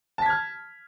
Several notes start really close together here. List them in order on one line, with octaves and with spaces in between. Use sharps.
A5 B6 G#6 F6